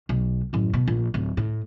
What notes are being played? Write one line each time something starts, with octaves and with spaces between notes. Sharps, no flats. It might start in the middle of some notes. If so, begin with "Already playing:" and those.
B1
A1 F#2
B2
A#1
D1
A2